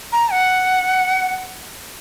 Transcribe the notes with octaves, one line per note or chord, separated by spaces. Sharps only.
A#5
F#5